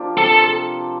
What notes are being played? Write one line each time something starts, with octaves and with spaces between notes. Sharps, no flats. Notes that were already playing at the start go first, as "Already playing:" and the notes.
Already playing: F3 A#3 D4 F4 G4
C3 C4 A4